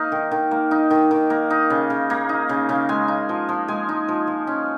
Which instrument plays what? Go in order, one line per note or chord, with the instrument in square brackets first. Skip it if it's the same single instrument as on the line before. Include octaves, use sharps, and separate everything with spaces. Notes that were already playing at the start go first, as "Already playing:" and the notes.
Already playing: [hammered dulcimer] A#3 D#4 F5
D#3
D#3
A#3
D#4
D#3
D#3
A#3
D#4
C#3
C#3
A#3
D#4
C#3
C#3
G#3 G#5
D#4
F3
F3
G#3 G#5
D#4
F3
F3
C#4